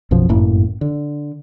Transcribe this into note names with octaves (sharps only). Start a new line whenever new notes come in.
B1 F#2 B2 F3
G1 F#2 A2 A#3
D3